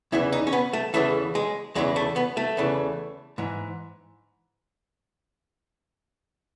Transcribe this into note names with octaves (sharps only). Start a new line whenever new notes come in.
E2 C#3 E3 E4
D#4
C#4
B3
A3
E2 C#3 E3 A3
G#3
E2 C#3 E3 G#3
A3
B3
A3
E2 C#3 E3
G#2 E3